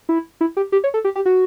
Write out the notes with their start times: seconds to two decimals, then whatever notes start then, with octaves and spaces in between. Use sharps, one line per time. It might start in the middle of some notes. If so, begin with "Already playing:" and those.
0.09 E4
0.41 E4
0.57 G4
0.72 G4
0.84 C#5
0.94 A4
1.05 G4
1.15 G4
1.26 F#4